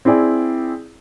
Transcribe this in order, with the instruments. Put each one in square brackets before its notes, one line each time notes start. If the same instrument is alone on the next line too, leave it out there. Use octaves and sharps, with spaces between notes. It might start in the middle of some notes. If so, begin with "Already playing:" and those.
[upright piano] C4 E4 G#4 D5 G#5